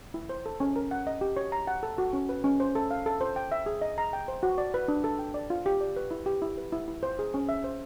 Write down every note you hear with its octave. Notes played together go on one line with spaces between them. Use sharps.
E4
C5
A4
C#4
A#4
F#5
D#5
G4
C#5
A#5
F#5
A4
F#4
C#4
B4
C#4
C5
A4
F5
A4
C5
G5
E5
G#4
D#5
A#5
G5
C5
F#4
D5
B4
D4
A4
G5
D5
F4
G4
D5
B4
E4
G4
E4
B4
E4
E4
C5
G#4
C#4
E5
C5